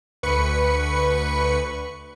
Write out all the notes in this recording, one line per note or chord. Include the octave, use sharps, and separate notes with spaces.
D2 B4 B5 C#6 C#7